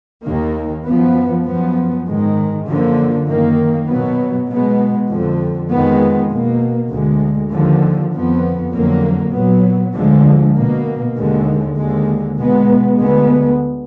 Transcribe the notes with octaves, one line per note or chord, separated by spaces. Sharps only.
D#2 D#3 A#3
F#2 F3 B3
F#2 F3 B3
G#2 D#3 G#3
F#2 D3 F3 A#3
F#2 D#3 A#3
B2 F#3 B3
B2 G#3 B3
F2 D3 F3
F2 D#3 G#3 B3
B2 A#3
D2 D3 G#3
D#2 D3 F3
F2 F3 B3
F2 D3 F#3 A#3
A#2 F#3 B3
D2 D3 F3 G#3
B2 A#3
D#2 D3 G#3
D#2 D3 G#3
B2 G#3 B3
D2 D3 G#3 B3